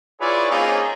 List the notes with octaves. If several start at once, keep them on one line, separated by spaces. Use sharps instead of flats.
E4 F4 G#4 B4 C#5 D5
A#3 C4 C#4 D#4 F4 G#4